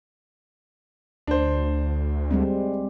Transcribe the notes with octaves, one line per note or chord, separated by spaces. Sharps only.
D2 D4 C5
G3 G#3 C4